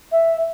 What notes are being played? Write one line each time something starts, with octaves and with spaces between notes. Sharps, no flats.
E5